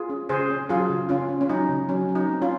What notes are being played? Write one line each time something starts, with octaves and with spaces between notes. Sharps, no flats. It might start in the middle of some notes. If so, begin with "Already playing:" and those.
Already playing: F4 G#4
C#4
C#3 G#4 C5
C#4
F#3 F4 G#4
C#3
C#3 C#4 F4
C#4
C#4
F#3 D#4
C#3
F#3 C#4
F#3
D#4
C4
C#4 F4